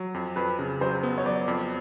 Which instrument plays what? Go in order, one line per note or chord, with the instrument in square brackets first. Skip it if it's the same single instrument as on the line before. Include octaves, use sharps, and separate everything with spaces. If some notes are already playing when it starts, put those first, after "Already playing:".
Already playing: [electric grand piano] F#3
F2
[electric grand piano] F2 [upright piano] B4
[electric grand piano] C#3
[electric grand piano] F#3 [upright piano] C5
[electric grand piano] B3
[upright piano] C#5
[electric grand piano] F#3 [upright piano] D5
[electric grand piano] F2